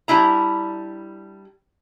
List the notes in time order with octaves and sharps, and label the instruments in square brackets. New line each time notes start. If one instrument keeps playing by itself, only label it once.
[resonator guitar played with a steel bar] G3 D4 E4 A#5